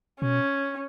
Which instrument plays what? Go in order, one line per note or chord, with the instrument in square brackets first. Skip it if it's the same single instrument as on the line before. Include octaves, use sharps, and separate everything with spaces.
[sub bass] B2 [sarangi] C#4